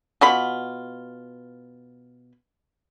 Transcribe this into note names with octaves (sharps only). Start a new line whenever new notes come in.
B2 F4 B5